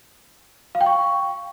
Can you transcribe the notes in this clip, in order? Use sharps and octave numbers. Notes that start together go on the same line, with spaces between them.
F5
G5
C#6